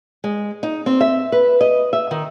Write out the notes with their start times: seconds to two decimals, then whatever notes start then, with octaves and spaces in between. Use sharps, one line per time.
0.24 G#3
0.63 D#4
0.86 C4
1.01 E5
1.32 B4
1.61 D#5
1.93 E5
2.11 D#3